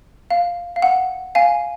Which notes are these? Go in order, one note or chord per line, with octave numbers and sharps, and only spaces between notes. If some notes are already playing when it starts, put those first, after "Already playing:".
F5
F5
F#5
F5 G#5